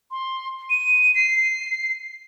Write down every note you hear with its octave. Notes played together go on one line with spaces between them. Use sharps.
C6
D#7
C7